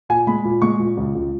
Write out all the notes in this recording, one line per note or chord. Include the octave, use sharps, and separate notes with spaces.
A#2 G#5
G#3 B5
A#2
G#3 C#6
A#2
C#2
C#2